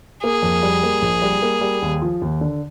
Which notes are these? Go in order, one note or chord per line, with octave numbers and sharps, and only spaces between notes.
A#3 G#4
F2
G3
A#3
A#1
G3
A#3
G3
D#2
F3
D#2
D3